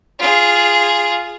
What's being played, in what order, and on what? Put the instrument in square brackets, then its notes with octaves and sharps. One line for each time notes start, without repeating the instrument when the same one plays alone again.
[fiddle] F4 G#4